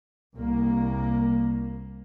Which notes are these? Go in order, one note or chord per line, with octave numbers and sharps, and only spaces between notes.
C2 A#3